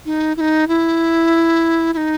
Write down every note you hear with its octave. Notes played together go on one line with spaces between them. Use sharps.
D#4
E4
D#4
E4
E4
D#4